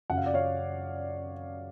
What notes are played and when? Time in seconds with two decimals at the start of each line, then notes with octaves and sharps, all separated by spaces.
0.10 F#2 C#3 F#3 F#5
0.17 F5
0.26 D5
0.34 C#5 F5